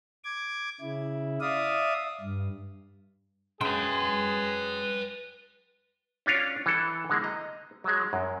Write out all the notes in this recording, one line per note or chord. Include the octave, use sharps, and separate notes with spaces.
D6 G#6
C#3 E4
D5 E5 F5 D#6
G2
F#2 G#4 B4 G5 C6
C#4 D4 F4 C#5
E3 A4
D3 G#3 A#3
D#5 A#5
F#3 G#3
F#2